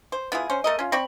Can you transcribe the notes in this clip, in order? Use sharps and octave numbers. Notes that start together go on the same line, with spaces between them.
C5
B3 E4 F4 G#4
C#4 C5
A3 A#4 D#5
C#4 F4
C4 D5 B5 C#6